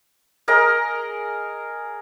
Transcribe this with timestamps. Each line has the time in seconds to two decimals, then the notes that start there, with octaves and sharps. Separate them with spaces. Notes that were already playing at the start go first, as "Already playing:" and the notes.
0.48 G#4 A#4 D#5 A#5